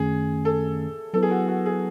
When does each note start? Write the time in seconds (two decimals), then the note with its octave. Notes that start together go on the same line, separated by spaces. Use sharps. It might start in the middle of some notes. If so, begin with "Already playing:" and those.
Already playing: F#2 D#3 A3 C#4 G#4
0.45 A4
1.14 F#3 B3 E4 A4 B4
1.22 G#4
1.31 F#4
1.48 F#4
1.66 G#4